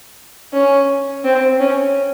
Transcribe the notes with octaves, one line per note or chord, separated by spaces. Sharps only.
C#4
C4
C#4